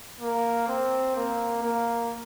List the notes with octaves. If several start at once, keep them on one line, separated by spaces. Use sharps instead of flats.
A#3
C4
A#3
A#3